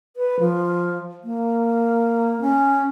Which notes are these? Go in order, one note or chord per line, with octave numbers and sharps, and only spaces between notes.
B4
F3
A#3
C#4